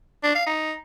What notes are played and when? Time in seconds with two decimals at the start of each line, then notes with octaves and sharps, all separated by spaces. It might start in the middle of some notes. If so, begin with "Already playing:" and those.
0.24 D4
0.35 F5
0.47 D#4